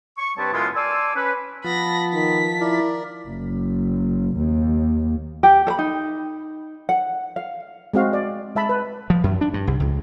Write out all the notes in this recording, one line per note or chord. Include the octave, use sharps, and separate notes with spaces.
C#6
G2 G3 C4 B4 C#5 A5
F#2 C#3 G#3 B3 E4 F4
D5 G#5 A5 C6 D6 E6
C#4 B4
F3 B3 F4 A5 B5 A#6
D#3 B6
E4 A#4 D5
F#1
D#2
G4 G5
A4 B5
D#4
F#5
F5
G#3 C4 F#4 F5
D5
G#3 E5 A5 B5
B4
F3
F#2
D4
G2
C2
C#2